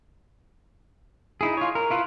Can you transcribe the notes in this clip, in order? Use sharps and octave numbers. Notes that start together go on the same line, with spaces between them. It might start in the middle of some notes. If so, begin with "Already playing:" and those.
D#4 E4 G#4
F4 C#5
A#4
E4 F4 B4